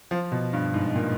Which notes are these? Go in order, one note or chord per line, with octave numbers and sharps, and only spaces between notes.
F3
B2
G2
G#2
A#2